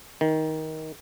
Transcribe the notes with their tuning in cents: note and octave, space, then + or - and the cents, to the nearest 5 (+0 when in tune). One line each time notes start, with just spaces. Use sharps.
D#3 +15